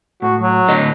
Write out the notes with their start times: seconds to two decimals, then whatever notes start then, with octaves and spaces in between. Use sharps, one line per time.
0.22 A2 F#4
0.41 F#3
0.68 A2 D3 D#5